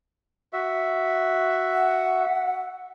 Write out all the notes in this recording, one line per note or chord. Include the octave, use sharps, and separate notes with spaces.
F#4 E5
F#5